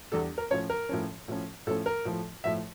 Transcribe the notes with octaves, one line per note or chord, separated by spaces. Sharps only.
E2 E3 G3 D4 A4
A#4
A2 F3 C#4 C#5
A#4
A2 F3 C#4
A2 F3 C#4
A2 F3 C#4 A4
A#4
A2 F3 A3
A2 F3 A3 E5